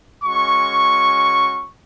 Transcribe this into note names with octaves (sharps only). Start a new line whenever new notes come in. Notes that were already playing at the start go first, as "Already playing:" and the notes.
G#3 C#4 F#4 C#6